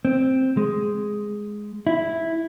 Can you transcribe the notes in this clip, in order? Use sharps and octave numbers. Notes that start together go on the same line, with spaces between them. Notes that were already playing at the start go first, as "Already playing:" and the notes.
C4
G#3
E4